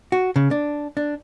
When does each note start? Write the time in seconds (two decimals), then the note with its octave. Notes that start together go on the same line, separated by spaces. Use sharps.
0.12 F#4
0.36 C#3
0.51 D4
0.97 D4